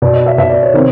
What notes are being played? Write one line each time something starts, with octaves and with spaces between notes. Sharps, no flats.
B2 D5
D#5
E5
B2 E5
D5
C#5
C3 D#3